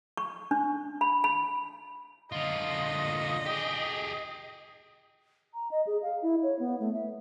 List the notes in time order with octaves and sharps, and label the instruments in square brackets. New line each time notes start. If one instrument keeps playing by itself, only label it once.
[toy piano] C#6
D4
B5
B5
[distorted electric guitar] D3 F4 [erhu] D#5
[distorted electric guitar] G4 G#4
[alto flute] A#5
D#5
G#4
F5
E4
C#5
B3
A3
E5